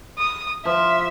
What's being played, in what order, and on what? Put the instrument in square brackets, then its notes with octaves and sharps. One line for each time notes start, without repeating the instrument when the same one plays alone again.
[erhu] D#6
[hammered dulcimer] F3 [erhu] E5